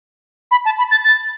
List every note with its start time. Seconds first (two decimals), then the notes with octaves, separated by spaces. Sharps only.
0.51 B5
0.65 A5
0.78 B5
0.91 A6
1.04 A6